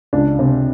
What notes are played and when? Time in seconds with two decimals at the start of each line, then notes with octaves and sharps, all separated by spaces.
0.13 C#2 D4 D5
0.39 C3